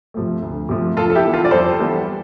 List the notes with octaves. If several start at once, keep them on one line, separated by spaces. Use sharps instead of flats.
C3 F3 A3
D2
C3 F3 A3
F2 F4 A4
A4
E4 G4
E3 G3 B3
F4 A4
D5
F2 A4 C5
E3 G3 B3